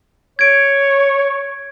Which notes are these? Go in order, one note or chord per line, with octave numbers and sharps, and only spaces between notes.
C#5 G#6 D7